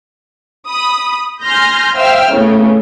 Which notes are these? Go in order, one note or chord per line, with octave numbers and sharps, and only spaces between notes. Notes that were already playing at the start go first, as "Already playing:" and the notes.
B5 D#6
G#5 C6 F6 G6 A#6
C5 E5 F5 G5 E6 F6
A2 C#3 A3 B3